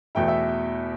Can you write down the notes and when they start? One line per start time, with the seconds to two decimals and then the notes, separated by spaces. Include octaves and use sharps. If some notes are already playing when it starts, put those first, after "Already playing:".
0.15 E2 B2 A3 E4 G5
0.28 E5